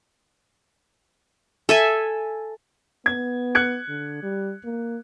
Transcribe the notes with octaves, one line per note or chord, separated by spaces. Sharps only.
A4 E5 G#5
B3 G#6
F#6 G#6 C#7
D3
G3
A#3